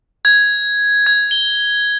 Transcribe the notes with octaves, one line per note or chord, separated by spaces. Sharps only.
G#6
G#6
G7